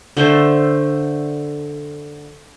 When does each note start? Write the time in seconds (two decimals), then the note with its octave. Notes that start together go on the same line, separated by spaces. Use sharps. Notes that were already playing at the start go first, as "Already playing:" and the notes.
0.17 D3 A3 C5